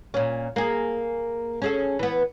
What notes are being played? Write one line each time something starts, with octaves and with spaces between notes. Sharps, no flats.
A#2 C#4
A#3 G#4
C#4 G#4 A4
E3 B3